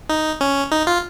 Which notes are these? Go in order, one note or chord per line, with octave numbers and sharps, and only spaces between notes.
D#4
C#4
D#4
F4